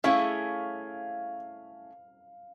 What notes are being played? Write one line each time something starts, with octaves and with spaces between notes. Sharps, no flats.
A3 C#4 E4 G#4 C#5 F5